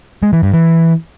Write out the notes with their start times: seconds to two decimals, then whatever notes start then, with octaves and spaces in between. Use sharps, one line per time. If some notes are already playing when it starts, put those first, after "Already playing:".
0.23 G#3
0.33 E3
0.43 G2
0.54 E3